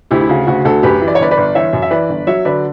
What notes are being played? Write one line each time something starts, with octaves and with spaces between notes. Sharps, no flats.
D2 E4 G4
E4
C#3 F#4
D2 F#4
D2 F#4 A4
F#2 G4 B4
E3
D5
C#5
G1 B4 D5
B4 D5
G1
E3 C#5 E5
F#2
E5
E3 B4 D5
G1
F#3 C#5 E5
D3 B4 D5